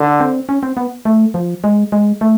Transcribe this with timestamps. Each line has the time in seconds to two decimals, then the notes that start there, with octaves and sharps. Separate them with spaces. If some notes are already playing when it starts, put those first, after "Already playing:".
Already playing: D3
0.20 C4
0.49 C#4
0.63 C4
0.77 B3
1.05 A3
1.34 F3
1.64 G#3
1.92 G#3
2.21 A3